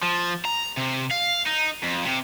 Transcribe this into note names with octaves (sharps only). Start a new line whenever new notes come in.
F3
A#5
C3
F5
D#4
F2
C3